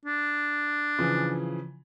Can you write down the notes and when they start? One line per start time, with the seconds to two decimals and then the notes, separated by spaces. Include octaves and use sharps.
0.05 D4
0.99 C#3 E3 F3